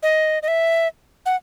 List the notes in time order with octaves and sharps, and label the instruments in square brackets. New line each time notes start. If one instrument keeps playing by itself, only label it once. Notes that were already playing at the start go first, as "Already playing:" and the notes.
[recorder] D#5
D#5
E5
F#5